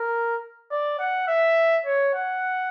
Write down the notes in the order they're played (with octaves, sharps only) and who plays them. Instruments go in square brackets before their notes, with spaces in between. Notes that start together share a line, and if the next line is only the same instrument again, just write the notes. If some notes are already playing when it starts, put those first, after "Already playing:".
Already playing: [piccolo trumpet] A#4
D5
F#5
E5
C#5
F#5